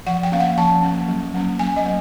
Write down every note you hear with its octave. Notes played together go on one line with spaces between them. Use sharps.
F3 F#5
G5
A#3 C#4 F5
F#5
F3 A5
A#3 C#4
F#3
A#3 C#4
F#3 G#5
D#5
A#3